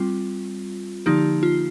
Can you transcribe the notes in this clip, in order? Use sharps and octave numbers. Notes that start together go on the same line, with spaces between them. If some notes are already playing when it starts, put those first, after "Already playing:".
Already playing: G3 C4 F4
D3 F3 A#3 D#4 G4
F4